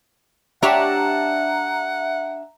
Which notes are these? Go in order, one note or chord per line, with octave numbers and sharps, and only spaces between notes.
D4 G4 C#5 E5 F#5 A#5